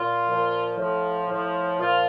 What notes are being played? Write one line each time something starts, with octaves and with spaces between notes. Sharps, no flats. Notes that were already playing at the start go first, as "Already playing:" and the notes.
Already playing: A#2 F4
A#2 F3
A2 F3
A2 F3
A#2 F3 F4